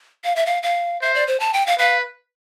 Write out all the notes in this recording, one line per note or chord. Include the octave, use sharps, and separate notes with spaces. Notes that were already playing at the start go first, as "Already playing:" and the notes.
F5
E5
F5
F5
C5 E5
D5
C5
A5
G5
F5
B4 F5